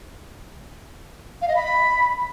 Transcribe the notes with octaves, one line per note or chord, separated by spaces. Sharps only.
F5
D#5
B5